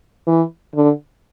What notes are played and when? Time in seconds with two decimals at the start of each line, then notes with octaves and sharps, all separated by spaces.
0.27 E3
0.75 D3